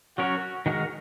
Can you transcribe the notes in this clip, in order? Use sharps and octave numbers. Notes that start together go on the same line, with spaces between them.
F#3 C#4 F#4 A#4 C#5
D#3 G#3 F#4 A#4